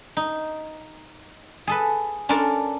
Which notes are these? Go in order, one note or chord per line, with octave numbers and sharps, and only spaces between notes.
D#4
G#4 A4 B4
C#4 D4 F4 A4 A#4 D5